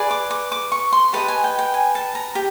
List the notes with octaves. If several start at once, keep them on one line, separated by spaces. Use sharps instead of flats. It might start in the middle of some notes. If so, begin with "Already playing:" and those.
Already playing: G#4 B4 D5
D6
D6
D6
C#6
C6
G4 B4 D#5 A5
G#5
G5
G5
G#5
A5
A#5
G4